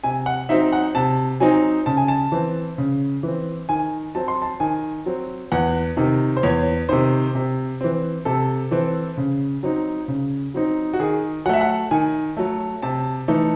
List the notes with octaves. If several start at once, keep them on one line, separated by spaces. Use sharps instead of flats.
C3 G#5
F#5
F#3 C4 D#4 E5
F#5
C3 A5
F#3 C4 D#4 G#5
C#3 A5
G#5
A5
E3 C4
C#3
E3 C4
D#3 G#5
F#3 C4 A5
C6
A5
D#3 G#5
F#3 C4
E2 F#5
C3 D#3
C5
E2 C#5
C3 D#3 C5
C3
E3 C4
C3 A4
E3 C4
C#3
F#3 C4 D#4
C#3
F#3 C4 D#4
F#4
D#3 G#4
F#3 A3 E5 F#5
F#5
D#3 G#5
F#3 A3
C3 A5
E3 A3 D#4